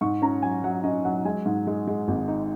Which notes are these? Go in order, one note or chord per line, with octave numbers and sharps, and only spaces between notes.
G#2 C#6
C#4 A#5
F#3 G#5
F#3 F#5
C#4 D#5
F#3 F#5
G#3 G#5
G#2
G#3
G#3
G#1
D#4